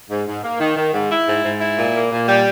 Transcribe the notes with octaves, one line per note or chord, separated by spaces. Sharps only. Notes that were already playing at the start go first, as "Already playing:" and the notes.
G#2
G#2
A#3
D#3
D#3
G#2
E4
G#2
G#2
E4
A#2
A#3
A#2
G3